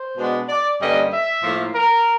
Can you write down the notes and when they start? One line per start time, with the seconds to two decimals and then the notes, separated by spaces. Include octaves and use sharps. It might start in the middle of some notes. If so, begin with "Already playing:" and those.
Already playing: C5
0.18 B2 G#3 B3 D4
0.49 D5
0.80 G2 D3 G3 A#3 C#4 D#5
1.12 E5
1.43 A2 F3 A#3
1.75 A#4